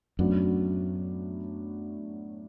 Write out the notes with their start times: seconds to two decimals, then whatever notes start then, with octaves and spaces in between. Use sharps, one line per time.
0.19 F#2 A2 F#3 B3 D4 F#4